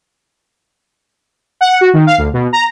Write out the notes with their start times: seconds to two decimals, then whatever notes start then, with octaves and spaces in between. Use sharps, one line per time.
1.61 F#5
1.81 F#4
1.93 D#3
2.07 F5
2.18 D2
2.33 B2
2.53 A#5